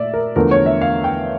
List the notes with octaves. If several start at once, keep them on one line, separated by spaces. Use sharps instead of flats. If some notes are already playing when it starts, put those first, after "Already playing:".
Already playing: A#2 A3 D5 E5
A#4
E2 D3 F3 A3 A#4
C#5
E5
F5
G5